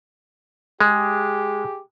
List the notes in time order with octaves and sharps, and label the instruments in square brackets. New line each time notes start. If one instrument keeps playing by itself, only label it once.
[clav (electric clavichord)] G#3 [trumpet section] G4 G#4